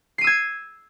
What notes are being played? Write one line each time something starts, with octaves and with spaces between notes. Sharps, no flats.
E6 G#6 C7 D#7